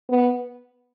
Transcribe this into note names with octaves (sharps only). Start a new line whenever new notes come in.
B3